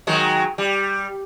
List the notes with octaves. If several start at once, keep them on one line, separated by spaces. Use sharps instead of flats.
D#3 F#3 G#3
G3